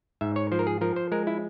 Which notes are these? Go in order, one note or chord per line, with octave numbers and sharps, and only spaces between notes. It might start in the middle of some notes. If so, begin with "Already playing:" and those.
G#2 E5
C#5
F3 C5
A#4
G#4
F3 A#4
C5
G#3 A#4
E4